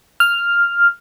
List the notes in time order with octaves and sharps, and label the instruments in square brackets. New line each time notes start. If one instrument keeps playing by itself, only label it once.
[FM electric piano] F6